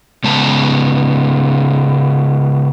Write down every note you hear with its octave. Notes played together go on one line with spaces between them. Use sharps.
C#3 G#3 B3 A5